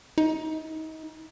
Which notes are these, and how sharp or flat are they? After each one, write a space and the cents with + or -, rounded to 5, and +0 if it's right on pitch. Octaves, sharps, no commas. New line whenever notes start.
D#4 +30